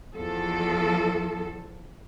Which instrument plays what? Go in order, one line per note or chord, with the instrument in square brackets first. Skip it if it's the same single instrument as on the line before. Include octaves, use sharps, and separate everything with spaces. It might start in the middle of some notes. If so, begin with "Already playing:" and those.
[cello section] E2 F3 A4